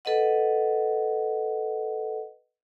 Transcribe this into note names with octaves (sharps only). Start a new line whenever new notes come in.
A4 B4 D#5 F#5